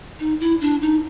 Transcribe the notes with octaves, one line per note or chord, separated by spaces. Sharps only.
D#4
E4
D4
D#4